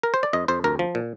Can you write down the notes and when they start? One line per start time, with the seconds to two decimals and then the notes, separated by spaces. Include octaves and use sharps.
0.03 A#4
0.14 C5
0.23 D5
0.33 F2 D#5
0.48 F2 C5
0.64 D2 A#4
0.79 F3
0.95 A#2